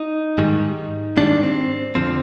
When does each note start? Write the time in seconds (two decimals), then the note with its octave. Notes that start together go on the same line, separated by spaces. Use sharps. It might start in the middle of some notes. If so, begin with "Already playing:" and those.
Already playing: D#4
0.38 G#2 D#3 G3
1.17 G#2 D#3 G3 D4
1.43 C4
1.95 F2 D3 F3 C4